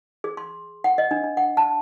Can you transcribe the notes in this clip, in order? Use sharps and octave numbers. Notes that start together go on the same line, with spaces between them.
G#4
C6
F#5
D#5
D4
D4
F#5
A5